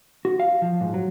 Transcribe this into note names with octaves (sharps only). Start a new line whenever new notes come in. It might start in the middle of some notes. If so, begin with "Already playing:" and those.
F#4
F5
F3
G#2
F#3